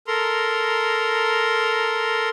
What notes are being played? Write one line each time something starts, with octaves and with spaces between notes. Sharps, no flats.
A4 A#4 A#5 C6